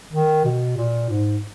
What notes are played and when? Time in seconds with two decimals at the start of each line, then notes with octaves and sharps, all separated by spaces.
0.12 D#3
0.44 B2
0.77 A#2
1.09 G#2